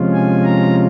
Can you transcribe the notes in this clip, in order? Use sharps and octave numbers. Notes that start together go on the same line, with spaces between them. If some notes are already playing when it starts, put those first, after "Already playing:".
Already playing: C3 F3 G#3 C#4 F4
G#5
A#5